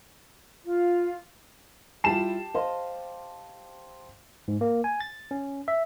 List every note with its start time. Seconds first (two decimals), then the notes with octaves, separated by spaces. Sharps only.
0.63 F4
2.04 G3 E4 F4 G4 A5 C7 E7
2.54 C5 D#5 F5 C6
4.48 G#2
4.61 A#3
4.84 G#5
5.00 A6
5.31 C#4
5.68 E5